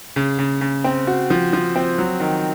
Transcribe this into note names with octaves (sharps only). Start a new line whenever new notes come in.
C#3
C#3
C#3
C4
F#4
F3
F3
C4
F#3
D#3